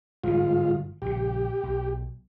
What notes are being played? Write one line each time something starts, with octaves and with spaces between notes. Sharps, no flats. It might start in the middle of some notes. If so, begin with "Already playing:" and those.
G1 G#2 B2 E3 F4
A#1 C#3 G4
B1